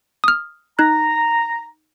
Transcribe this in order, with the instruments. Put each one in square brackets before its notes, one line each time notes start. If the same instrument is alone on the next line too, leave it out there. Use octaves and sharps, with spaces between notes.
[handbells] D#6 F6
[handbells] D#4 F#6 [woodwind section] A#5